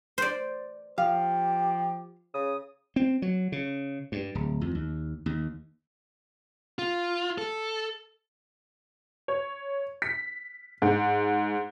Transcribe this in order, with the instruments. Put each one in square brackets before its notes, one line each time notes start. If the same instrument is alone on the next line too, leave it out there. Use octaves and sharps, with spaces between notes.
[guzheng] C5 D5
[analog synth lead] F3 [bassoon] G4 [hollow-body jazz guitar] F5
[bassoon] C#3 [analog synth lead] D#6
[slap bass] C4
F#3
C#3
G2
D1
F2
D#2
D#2
[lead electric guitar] F4
A4
[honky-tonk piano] C#5
B6
G#2